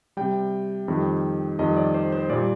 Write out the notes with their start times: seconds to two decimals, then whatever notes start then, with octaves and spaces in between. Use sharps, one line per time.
0.17 C3 G3 G5
0.88 F2 D#3 G3
1.59 F2 D#3 G3 D#5
1.77 D5
1.94 C5
2.12 C5
2.30 A#2 G3 D5